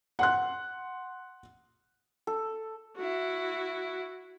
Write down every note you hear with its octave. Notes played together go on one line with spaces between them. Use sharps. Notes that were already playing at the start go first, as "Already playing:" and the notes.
F#5 C6 F#6
A4
E4 F#4